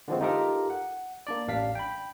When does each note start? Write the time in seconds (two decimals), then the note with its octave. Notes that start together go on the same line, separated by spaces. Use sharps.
0.08 D3 E3 F3 G#3 A3 C4
0.21 D#4 F4 G4 A4 A#4 D#5
0.70 F#5
1.27 A#3 D4 D5
1.48 A1 D4 F5 B6
1.75 G5 B5